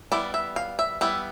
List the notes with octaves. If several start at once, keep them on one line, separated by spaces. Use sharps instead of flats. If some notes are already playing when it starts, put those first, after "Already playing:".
G3 B3 E4 D5
E5
F5
E5
G3 B3 E4 E5